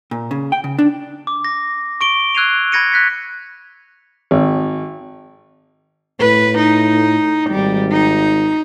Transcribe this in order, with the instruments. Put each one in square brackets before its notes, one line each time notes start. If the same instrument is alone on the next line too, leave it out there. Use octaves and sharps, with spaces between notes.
[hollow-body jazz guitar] A#2
C#3
G5
C#3
D4
[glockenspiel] D6
A#6
C#6 D7 G7
E6 F#6 G#6 C7 D#7 F7
B5 G#6 A#6 C#7 D#7
F#6 B6 C#7
[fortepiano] G#1
[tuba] A2 [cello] B4
[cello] D#4
[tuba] G#1 [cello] G3
[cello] D#4